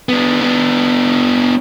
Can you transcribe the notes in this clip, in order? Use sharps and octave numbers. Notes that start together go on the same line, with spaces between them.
B3 D4
B3 D4